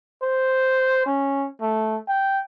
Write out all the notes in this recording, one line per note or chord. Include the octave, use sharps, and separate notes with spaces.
C5
C#4
A3
G5